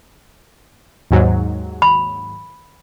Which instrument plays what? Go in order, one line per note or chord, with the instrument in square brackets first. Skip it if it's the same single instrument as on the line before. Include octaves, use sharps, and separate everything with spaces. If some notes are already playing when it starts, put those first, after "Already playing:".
[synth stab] D#2 G#2 F#3
[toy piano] B5